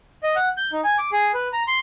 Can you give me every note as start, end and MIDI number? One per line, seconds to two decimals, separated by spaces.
0.23 0.35 75
0.36 0.49 78
0.57 0.71 91
0.73 0.81 63
0.84 0.97 80
0.98 1.11 86
1.12 1.32 68
1.34 1.48 71
1.53 1.63 82
1.68 1.79 84